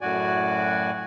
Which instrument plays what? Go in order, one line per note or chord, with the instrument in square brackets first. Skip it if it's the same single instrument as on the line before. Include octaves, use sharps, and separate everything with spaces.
[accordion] F#2 A2 F#4 D5 G#5